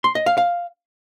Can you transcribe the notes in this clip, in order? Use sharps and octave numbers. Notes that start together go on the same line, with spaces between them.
C6
D#5
F5
F5